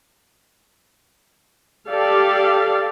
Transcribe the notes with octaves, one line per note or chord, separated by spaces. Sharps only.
G4 A4 D5 F5